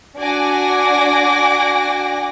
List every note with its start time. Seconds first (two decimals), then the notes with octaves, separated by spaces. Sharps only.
0.18 D4 F#4 G#5 D6 A#6